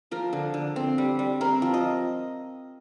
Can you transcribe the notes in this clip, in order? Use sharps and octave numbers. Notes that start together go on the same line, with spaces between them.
F3 A#4
D3
D3
C4
G3
G3
C4 A#4
F3
D#5